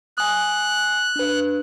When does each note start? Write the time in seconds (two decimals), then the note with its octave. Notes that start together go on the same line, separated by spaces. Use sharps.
0.18 G#5 D#6 F#6
1.16 D4 B4